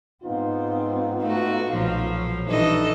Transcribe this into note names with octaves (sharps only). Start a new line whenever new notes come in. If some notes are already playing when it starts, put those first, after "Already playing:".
G#2 B3 C4 D#4 F4
A3 F#4
B1 A#2 F3 F#3
A#1 G2 E3 D#4 A4 D#5